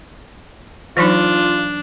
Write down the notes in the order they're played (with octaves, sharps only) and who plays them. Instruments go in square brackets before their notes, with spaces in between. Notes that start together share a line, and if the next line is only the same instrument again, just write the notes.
[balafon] E3 F#3 D#4 [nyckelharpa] D4 [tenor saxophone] F4